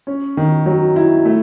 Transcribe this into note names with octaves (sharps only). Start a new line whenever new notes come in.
C#4
D#3
F#3
E4
A3